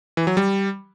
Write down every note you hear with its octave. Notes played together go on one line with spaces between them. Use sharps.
E3
F#3
G3